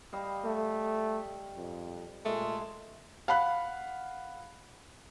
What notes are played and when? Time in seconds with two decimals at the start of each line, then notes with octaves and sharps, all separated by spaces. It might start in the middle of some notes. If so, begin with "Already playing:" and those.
0.12 G3 D#5 F5
0.44 A3
1.57 F2
2.25 A#2 G#3 A3 G#4
3.28 F5 F#5 B5 F#6